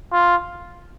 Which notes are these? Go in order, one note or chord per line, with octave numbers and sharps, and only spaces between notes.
F4